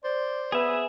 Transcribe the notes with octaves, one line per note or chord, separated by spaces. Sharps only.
C5 D5
B3 G#4 B4 E5